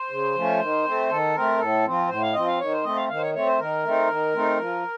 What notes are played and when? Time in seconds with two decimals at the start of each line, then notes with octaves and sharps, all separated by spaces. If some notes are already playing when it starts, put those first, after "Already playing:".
Already playing: C5
0.10 C#3
0.35 F3 A3 C#4
0.60 D#3
0.85 A3 C4
1.09 D#3 A4
1.35 A3 C4 A#4
1.60 A2 A4
1.85 F3 C4
2.09 A2 C5
2.22 F5
2.34 F3 C4 D#5
2.47 F5
2.59 D#3 C#5
2.72 C5
2.84 A3 C4 D#5
2.96 F5
3.09 D#3 F5
3.17 C5
3.22 C#5
3.34 A3 C4 C#5
3.47 C5
3.59 D#3 A#4
3.83 A3 C4 D#4
4.09 D#3
4.34 A3 C4 D#4
4.59 F3